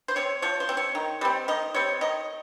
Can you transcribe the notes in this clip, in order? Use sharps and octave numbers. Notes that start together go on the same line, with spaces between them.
C5
C4 C#5
F3 C#5
C5
C4
C#5
D#3
G3 C4
D#3 D#5
G3 C4 C#5
D#3 D#5